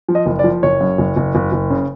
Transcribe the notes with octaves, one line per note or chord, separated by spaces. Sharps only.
F3
D#5
F#1
D5
F3
F#1 C#5
F#2
F#1
F#1
F#1
F#1
C#3